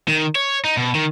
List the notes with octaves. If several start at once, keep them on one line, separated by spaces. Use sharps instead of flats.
D#3
C#5
D#4
B2
D#3